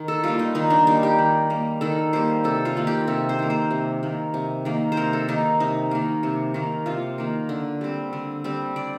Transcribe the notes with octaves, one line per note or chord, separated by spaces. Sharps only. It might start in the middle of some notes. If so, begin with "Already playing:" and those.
Already playing: D#3
A4
G3 A#3 F4
D#4
D#3 D#4
D4
G3 A#3 D#4
G4
D#3
G3 A#3
D#3 A4
G3 A#3 C5
C3 A4
F4
D#3 A#3
G4
C3 A4
C5
D#3 A#3
C5
C3
D#3 A#3
C3
D#3 A#3
C5
C3 A#4
A4
D#3 A#3 D#4
C3 D#4
D#3 A#3
C3
D#3 A#3
C3 F4
D#3 A#3
D3
G3 C4
D3
G3 C4
D3 D5